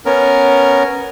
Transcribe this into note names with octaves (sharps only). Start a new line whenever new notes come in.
B3 C#4 A#4